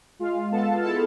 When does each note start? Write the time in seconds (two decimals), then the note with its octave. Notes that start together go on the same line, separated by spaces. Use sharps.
0.19 G#3 F4 F5
0.52 B3 A4 A5
0.82 E4 A4 A5